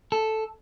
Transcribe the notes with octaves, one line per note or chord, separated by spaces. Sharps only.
A4